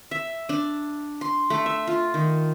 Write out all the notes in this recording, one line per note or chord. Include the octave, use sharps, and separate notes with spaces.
E5
D4
C6
A3
E5
F4
D#3